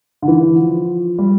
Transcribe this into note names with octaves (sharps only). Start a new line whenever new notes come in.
D3
E3
F3
G3